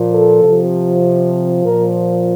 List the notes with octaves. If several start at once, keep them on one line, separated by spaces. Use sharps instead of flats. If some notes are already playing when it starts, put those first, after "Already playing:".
Already playing: A#2 F3
A4
C3 F3
A#2 F3 A#4